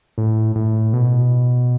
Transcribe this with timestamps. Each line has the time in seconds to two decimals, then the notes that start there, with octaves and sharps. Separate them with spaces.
0.18 A2
0.56 A2
0.93 B2